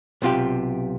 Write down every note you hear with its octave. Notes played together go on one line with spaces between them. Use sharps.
B1 C3 F4 G4